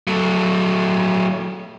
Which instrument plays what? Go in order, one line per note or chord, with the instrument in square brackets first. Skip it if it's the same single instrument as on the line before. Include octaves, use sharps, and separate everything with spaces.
[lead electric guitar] F#3 A3